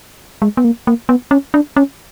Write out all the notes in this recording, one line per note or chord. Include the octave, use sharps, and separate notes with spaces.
G#3
B3
A#3
A#3
B3
C#4
D4
C#4